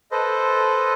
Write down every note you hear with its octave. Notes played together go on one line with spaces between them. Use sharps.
A4 B4 C5 D#5